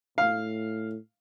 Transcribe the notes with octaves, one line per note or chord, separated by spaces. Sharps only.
A2 F5